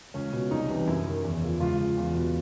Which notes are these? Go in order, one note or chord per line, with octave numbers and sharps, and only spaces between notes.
C#2 C#4
B2
C2 D#4
C3 E3
F#2 E4
D#3
E2
C#3 F3
C#2 F4
C#3 F3
E2
B2